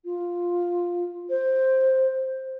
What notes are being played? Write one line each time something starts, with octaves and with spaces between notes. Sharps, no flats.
F4
C5